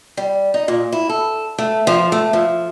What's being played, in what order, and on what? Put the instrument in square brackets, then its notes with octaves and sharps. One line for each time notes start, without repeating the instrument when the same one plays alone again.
[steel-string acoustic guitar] G3
D#4
A#2
E4
A4
A3
F3
A3
F3